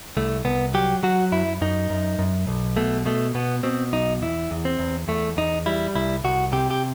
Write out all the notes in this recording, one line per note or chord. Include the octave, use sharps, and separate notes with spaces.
C2 A3
C2 B3
F#3 G4
F#3 F#4
F#2 E4
F#2 D#4
F#2
F#2
B1
B2 A3
B2 A3
B2 B3
B2 C4
B1 D#4
E2 E4
E2
C4
E2
E2 A3
E2 D#4
G3 E4
C2 E4
C2 F#4
C3 G4
G4